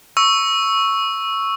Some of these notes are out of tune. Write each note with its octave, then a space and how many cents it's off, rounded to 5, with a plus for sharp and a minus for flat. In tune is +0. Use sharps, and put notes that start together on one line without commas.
C#6 +0 E6 -5